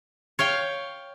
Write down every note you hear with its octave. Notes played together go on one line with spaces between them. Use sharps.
C#5 F5 G5